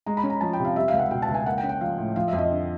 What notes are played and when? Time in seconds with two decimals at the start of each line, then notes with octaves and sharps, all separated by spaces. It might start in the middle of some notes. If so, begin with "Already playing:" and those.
0.06 G#3 A#5
0.17 B5
0.23 C#4
0.30 A#5
0.41 F3 A5
0.53 G5
0.59 C3
0.65 F5
0.76 G3 E5
0.88 F5
0.93 C#2
0.99 F#5
1.11 B2 G5
1.22 A5
1.29 C#2
1.34 G#5
1.46 A#3 F#5
1.58 G5
1.63 C#4
1.69 G5
1.80 F3 F5
1.98 A2
2.16 F3 F5
2.28 F2 E5
2.38 D#5
2.51 D3